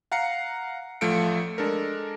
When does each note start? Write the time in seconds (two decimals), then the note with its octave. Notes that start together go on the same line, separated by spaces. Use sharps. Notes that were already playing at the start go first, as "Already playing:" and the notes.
0.12 F5 F#5 A#5 C7 C#7
1.01 A1 F3 A3 F5 C#7 D7
1.58 G#3 D4 A4 A#4